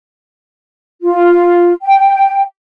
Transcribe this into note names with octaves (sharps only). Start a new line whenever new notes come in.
F4
G5